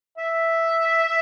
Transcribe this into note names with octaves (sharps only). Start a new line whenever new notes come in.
E5